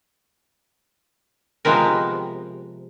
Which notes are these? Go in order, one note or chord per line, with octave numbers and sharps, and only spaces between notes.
C3 F3 G#3 B3 A#4